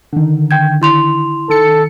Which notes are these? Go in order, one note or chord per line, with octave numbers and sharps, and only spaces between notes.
D3 D#3
G5 G6 G#6
E4 C6 F7
D#3 A4 C#7